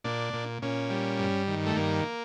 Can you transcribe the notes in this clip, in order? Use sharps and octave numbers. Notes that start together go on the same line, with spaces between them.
A#2 D4
A#2
A#2 C#4
G3
G2
D#3
A3
G2 A#3